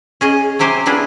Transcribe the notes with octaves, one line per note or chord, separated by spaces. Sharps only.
C#4 G#4 D#5
C3 F#3 G4 C5 G#5
B3 D4 E4 F4 G#4